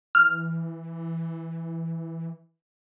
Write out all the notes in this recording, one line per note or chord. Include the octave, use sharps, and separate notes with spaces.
E3 F6